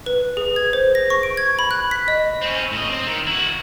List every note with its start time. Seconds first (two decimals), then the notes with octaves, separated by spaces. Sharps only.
0.06 B4
0.37 G#4
0.56 G#6
0.73 C5
0.95 A#6
1.10 C#6
1.23 D7
1.37 G#6
1.59 B5
1.71 F#6
1.91 B6
2.08 D#5
2.42 C4 C#4
2.73 A2 D#5
2.90 C4
3.07 D#3
3.27 E4 F#4